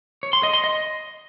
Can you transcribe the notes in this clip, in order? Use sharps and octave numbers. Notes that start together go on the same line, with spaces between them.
C#5
C6
D#5
C6
D#5